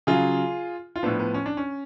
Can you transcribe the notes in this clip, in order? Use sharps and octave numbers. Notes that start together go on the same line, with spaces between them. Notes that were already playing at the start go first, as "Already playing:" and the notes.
C#3 F#3 F4 G#4
F4
A2 F3 B3 D4
B3
C#4
D4
C#4